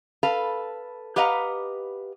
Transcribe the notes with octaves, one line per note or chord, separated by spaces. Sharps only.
A4 B4 F5
G4 B4 D#5 F5 F#5 A#5